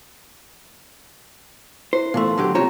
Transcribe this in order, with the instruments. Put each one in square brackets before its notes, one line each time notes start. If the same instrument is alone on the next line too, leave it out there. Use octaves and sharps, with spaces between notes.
[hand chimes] E4 [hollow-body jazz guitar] C5
[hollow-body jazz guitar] A#2 E3 A3 [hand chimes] B3 A5 C6
[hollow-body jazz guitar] D3 F#3 G4
[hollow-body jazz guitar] C2 G4 C#5 [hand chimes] C4 F4 A#5